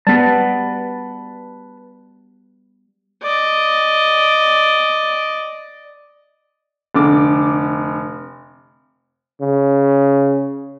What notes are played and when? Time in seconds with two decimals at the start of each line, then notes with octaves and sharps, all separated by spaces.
0.07 G3 B3 B4 A5
3.22 D5 D#5
6.94 F1 D3 D6
9.41 C#3